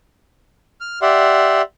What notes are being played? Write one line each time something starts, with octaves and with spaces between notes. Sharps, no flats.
F6
G4 D5 E5 F#5 C6